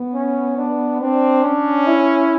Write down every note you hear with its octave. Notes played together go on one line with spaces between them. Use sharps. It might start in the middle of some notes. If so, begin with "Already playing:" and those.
Already playing: B3
C#4
D4
C4 D4
C#4
E4